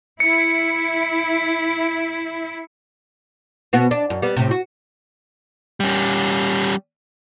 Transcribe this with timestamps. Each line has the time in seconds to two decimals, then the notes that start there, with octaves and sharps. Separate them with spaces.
0.20 E4 C#7
3.73 B2 B3 F#4
3.91 D4
4.10 F#2
4.22 G3 B3
4.36 A2 C3
4.51 F#4
5.80 G3 C#4